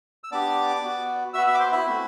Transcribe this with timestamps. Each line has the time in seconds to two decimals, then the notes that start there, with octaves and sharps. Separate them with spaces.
0.24 E6
0.32 B3 D4 G4 D5 D6
0.83 B3 F#4
1.34 B3 F#4 E5 E6
1.47 E5 E6
1.54 D6
1.59 C5 C6
1.72 E4 E5
1.86 A3 C4 F#4